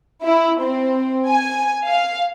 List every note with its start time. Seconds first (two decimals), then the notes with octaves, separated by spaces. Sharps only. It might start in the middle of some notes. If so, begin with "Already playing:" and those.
0.24 E4
0.61 C4
1.29 G#5
1.88 F5